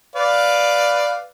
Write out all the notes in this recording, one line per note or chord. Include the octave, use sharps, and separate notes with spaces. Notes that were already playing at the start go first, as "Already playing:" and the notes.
B4 D5 F5